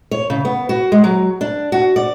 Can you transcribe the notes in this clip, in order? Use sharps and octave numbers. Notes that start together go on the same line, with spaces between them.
C#5
C#3
B3
F#4
G#3
F#3
D4
F#4
D5